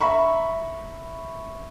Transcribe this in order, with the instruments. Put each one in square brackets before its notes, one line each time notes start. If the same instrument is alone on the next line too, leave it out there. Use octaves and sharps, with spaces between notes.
[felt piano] E5 A#5 B5 C#6